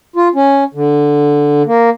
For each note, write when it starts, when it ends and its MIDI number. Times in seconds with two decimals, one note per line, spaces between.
0.16 0.28 65
0.35 0.64 61
0.74 1.63 50
1.67 1.90 58